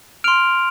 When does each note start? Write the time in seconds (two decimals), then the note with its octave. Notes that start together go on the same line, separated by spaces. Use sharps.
0.24 C6 F6 D7 F7